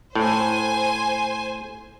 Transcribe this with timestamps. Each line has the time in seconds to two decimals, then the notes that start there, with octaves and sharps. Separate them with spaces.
0.15 A2 C5 G#5